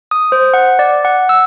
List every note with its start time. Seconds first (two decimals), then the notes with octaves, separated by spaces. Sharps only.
0.11 D#6
0.32 C5
0.54 F#5
0.79 D5
1.05 F#5
1.29 E6